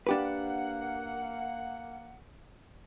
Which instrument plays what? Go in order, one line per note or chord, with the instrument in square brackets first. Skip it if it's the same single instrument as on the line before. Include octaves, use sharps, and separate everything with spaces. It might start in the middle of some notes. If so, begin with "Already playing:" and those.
[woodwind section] A#3 F#5 [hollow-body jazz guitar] D4 G4 B4